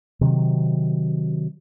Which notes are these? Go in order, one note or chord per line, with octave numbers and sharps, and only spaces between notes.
C3 D#3 F#3